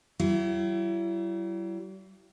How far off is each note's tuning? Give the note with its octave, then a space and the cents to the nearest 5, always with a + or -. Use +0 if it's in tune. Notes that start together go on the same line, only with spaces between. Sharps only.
G3 -45 E4 +35